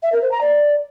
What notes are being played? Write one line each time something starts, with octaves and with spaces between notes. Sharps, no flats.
E5
A#4
C5
A#5
D5